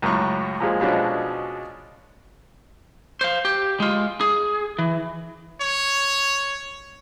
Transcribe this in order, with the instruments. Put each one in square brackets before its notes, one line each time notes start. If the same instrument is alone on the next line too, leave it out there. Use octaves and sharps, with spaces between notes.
[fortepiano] C#2 F#2 A2 C#6
A#2 F3 G#3
B2 F3 G#3 C#4 D4 F#4
[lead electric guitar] C5 F5
G4
G#3 F4
G#4
E3
[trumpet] C#5